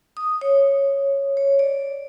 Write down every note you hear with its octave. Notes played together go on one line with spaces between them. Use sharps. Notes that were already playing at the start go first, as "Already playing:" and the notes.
D#6
C#5
C#5
D5